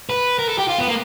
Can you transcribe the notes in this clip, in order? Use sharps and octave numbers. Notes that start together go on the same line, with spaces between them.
B4
A#4
A4
G4
F4
B3
A#3